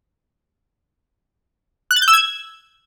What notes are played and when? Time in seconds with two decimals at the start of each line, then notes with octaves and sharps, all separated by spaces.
1.91 F#6
1.96 A6
2.02 G6
2.08 E6
2.13 G#6